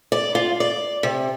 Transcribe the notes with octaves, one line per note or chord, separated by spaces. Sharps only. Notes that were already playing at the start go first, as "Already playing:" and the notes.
D5
F4
D5
C3